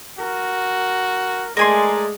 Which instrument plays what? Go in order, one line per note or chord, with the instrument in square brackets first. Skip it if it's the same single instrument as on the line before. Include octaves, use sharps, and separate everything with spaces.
[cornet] F#4 [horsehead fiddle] A#4
[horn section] G#3 [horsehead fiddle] A3 D5 [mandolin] A#4 G#5 C6